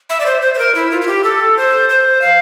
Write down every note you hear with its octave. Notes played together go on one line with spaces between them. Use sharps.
E5
D5
C5
C5
C5
A#4
E4
F4
F4
G4
A4
C5
C5
F5